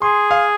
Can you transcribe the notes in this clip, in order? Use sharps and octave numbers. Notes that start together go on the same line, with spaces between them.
G#4 C6
F5